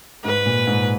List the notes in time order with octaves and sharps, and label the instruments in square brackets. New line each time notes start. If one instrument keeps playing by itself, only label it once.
[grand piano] G#2 [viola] B4
[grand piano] A#2
G#2